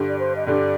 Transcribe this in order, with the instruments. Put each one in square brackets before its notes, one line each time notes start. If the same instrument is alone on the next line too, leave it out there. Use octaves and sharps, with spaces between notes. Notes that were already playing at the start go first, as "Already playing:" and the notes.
Already playing: [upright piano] G2 D3 G3
[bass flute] D5
C5
D#5
[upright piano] G2 D3 G3 [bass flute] D5